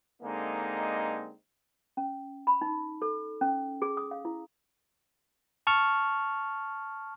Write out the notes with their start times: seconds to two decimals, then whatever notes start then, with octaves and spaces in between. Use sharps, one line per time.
0.22 D3 G#3 A#3 C4 D#4
1.97 C#4
2.47 B5
2.61 D#4
3.02 A4
3.41 C#4
3.82 G#4
3.97 D#6
4.11 F5
4.25 E4
5.67 A5 C#6 F6